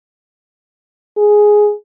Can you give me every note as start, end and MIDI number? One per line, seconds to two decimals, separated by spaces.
1.17 1.73 68